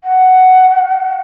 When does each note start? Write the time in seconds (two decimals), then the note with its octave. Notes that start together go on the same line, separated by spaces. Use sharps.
0.04 F#5